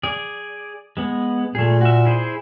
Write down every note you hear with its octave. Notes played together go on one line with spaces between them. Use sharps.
G#4 D5
G#3 B3
A#2 A3 G#4
F#4 E5
E4 G#4 C5